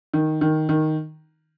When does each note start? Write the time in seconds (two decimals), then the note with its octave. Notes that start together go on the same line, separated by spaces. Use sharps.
0.14 D#3
0.41 D#3
0.69 D#3